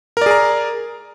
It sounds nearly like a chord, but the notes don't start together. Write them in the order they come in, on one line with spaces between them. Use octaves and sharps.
A#4 D5 G#4 A#5